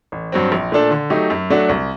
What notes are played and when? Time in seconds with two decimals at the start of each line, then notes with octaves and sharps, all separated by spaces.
0.12 A1
0.32 G2 F#3 C4
0.52 A#1
0.72 A#2 A3 D4 A4
0.91 D3
1.10 F#3 A3 D#4 G4
1.30 F#2
1.50 F#3 A3 D4 F#4
1.69 C2